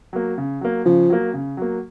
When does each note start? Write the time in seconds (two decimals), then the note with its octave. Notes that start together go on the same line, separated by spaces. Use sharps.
0.13 F#3 A#3
0.38 C#3
0.61 F#3 A#3
0.85 C#3 F3
1.10 F#3 A#3
1.34 C#3
1.57 F#3 A#3